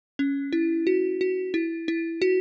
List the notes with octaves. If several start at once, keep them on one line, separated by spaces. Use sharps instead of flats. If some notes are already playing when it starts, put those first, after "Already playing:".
C#4
E4
F#4
F#4
E4
E4
F#4